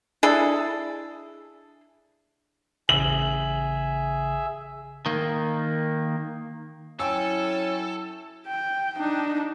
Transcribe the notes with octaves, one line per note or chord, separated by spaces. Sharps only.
D4 E4 G#4 A4
A1 C#3 G#4 E5 F#7
D#3 A#3
F#3 C#4 E4 A4 G5 G#5 E6
G5
D4 D#4